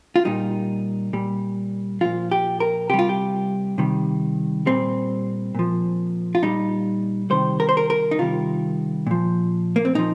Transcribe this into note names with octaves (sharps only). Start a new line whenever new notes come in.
F4
A#2 G3 D#4
A#2 G3
A#2 F3 F4
G4
A#4
C3 G3 G4
F4
G4
C3 D#3 G3
A#2 G3 C4
A#2 F3
F4
A#2 G3 D#4
C3 D#3 G3 C5
A#4
C5
A#4
A#4
D#4
C3 D#3 G3 F4
A#2 F3
A#3
C4
A#2 F3 D#4